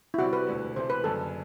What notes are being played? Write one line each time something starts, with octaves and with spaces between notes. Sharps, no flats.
E4
C3 G3 C4 F#4 G4 D5
B4
E1 D2 D3
C3 E3 A3 C5
B4
F#1 F#2 D3 A4